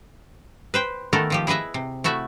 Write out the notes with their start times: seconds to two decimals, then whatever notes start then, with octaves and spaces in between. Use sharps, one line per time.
0.74 B4 C5 G5
1.13 D#3 A3 B3 A4 A#4
1.30 D#3 F3 G4
1.47 E4 G#4 B4 D#5 E5
1.74 C3
2.04 A3 E4 F#4 E5